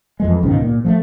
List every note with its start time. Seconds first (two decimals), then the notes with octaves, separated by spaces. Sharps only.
0.20 F2 E3 G#3
0.43 C#2 G#2 B2 D#3
0.62 A#2
0.85 F3 G#3 A3